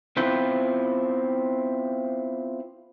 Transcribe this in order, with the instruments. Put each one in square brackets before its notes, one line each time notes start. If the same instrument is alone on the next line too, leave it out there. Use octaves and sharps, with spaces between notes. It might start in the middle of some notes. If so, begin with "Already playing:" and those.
[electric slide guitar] B3 C4 E4 F4 C5